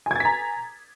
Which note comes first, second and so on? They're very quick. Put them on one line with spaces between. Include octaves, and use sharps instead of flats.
G#5 G#6 A6 B6 A#5